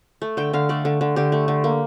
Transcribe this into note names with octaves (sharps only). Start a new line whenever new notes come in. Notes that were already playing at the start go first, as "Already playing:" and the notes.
A3
D3 G5
D3 F5
A3 D5
D3
D3
D3 G4
A3
D3
A#3